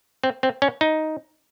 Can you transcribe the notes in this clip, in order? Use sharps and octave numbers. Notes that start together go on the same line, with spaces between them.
C4
C4
C#4
D#4